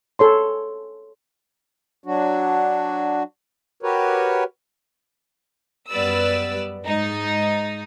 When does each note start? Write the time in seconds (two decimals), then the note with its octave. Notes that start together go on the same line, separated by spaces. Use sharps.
0.19 G#4 A4 C#5 C6
2.04 F#3 D4 F#4
3.83 F#4 G4 A#4 B4 C#5
5.90 F#2 G3 B3 B4 D5 E6
6.84 G#2 D#4